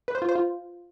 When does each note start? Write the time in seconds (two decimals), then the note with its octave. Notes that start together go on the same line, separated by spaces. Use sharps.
0.08 B4
0.15 C5
0.22 F4
0.29 C5
0.35 F4